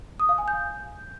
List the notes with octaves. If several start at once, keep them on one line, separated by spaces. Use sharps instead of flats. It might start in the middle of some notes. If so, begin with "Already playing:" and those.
D#6
F5
G#5
G6